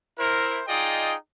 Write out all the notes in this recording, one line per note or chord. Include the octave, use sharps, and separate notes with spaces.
E4 A#4 C5
D#4 F4 G#4 D5 D#5 G5